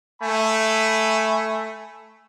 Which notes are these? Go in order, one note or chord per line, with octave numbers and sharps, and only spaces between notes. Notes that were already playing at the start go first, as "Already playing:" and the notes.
A3 G#5 B5